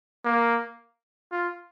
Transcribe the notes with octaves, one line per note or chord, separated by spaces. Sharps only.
A#3
F4